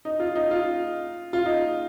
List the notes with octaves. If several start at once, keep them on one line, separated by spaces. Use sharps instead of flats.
D#4
F4
D#4
F4
F4
D#4